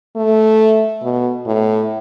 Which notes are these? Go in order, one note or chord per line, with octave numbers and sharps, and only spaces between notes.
A3
B2
A2